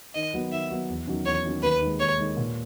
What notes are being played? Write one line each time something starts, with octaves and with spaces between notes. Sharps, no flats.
D#3 D#5
F#3 B3 F#4
D#3 E5
F#3 B3 F#4
E2
D#3 F#3 C#4
E2 C#5
D#3 F#3 C#4
D#2 B4
D#3 G#3
D#2 C#5
D#3 G#3
A#2